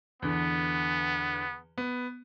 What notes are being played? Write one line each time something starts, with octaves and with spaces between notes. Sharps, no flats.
E2 D3 B3
B3